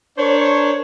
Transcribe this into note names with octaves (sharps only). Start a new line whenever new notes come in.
D4 A#4 C5 C#5